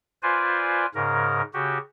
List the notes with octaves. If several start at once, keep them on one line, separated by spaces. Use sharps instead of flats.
F4 B4 C5 D5 G#5
G#2 C#3 A#4
C#3 F#4 G4